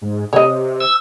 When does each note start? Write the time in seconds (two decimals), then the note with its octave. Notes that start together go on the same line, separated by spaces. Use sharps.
0.02 G#2
0.33 C3 C#5 D#5
0.80 E6